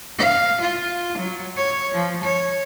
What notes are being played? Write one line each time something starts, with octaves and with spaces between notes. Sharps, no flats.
F5
F4
F#3
C#5
F3
C#5